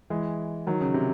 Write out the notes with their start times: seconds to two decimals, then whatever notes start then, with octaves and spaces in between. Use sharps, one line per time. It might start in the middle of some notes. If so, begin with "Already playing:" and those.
0.10 E3 G#3
0.67 D#3 F#3
0.81 C#3
0.94 C3